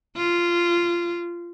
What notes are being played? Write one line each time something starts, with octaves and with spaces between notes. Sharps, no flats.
F4